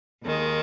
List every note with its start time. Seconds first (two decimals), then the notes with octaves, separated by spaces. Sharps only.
0.24 D#2 D#3 G#3